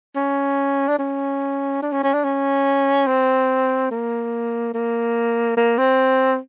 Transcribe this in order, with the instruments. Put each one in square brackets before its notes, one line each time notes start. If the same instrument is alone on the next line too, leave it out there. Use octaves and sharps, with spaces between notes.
[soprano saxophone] C#4
D4
C#4
D4
C#4
C#4
D4
C#4
C4
A#3
A#3
A#3
C4